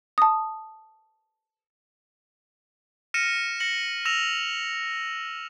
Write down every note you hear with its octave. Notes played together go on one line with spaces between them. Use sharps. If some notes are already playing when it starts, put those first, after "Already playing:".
A5 D#6
F6 A#6 C#7 D#7 E7
A#6 C#7 F#7
E6 A#6 E7 F7